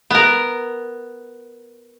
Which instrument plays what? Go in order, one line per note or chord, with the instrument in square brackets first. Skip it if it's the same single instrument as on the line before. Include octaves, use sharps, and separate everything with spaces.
[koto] B3 A#4